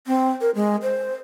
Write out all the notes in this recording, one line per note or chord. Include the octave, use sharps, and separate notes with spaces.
C4
A#4
G#3
C5